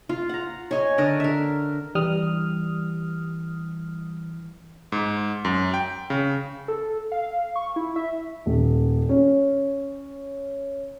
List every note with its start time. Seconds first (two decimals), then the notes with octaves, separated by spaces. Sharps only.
0.09 F4
0.29 F#5 A#5
0.71 C#5 D#5 G#5
0.98 D3 A4 A#4 D#5
1.20 A#4 E5
1.95 E3 G3 D#6 F6
4.92 G#2
5.45 F#2
5.74 G5
6.10 C#3
6.68 A4
7.12 F5
7.56 C#6
7.76 E4
7.96 E5
8.46 D#1
9.09 C#4